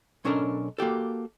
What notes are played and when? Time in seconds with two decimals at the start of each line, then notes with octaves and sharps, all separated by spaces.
0.25 B1 C#4 D4 A4 A#4 A#5
0.78 A#3 F#4 G4 A4